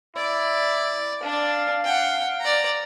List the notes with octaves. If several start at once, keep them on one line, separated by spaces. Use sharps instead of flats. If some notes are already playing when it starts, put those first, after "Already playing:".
E4 D5
D4 D5 F5
F#5 G5
D5 A#5